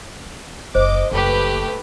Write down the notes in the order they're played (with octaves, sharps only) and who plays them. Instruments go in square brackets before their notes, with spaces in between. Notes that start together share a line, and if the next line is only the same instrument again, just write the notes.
[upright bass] F#1 [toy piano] C5 [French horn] D#5 [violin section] D6
[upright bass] F#1 [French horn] A3 [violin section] G4 B4